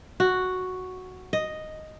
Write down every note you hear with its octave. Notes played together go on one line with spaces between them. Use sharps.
F#4
D#5